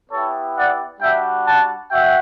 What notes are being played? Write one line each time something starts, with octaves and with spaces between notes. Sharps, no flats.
B3 E4 G4 A4 C#5
D5 F#5
G3 D4 F#4 E5 G5
F#5 A5
F#4 E5 G5